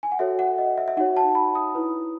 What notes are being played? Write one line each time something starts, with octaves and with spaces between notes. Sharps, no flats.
G#5
F#5
F#4 A4 C#5 E5
F#5
D#5
E5
E5
D#4 F#4 C#5 F#5
A5
B5
D#6
E4 B4